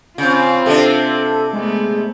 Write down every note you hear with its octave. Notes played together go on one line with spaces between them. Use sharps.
C#3 C4 F4
C3 D4 A4
G#3 A3 B3